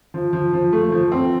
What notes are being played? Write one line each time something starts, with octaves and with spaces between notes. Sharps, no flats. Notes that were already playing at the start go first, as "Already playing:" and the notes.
F3
F3
F3
A3
F3
C4